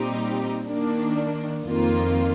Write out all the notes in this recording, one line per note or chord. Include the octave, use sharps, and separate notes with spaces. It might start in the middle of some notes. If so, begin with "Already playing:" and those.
Already playing: A#2 G3 C4 D#4 G4
D#3 A#3 D4
F2 D#3 A#3 F4